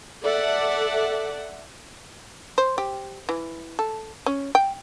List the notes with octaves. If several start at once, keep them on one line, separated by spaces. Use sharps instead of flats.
A4 D5 E5 F#5
C5
G4
E3
A4
C#4
G5